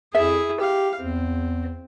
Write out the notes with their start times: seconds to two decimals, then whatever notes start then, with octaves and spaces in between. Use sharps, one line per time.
0.15 F2 E4 G#4 E5
0.60 G4 F5
1.00 E2 C4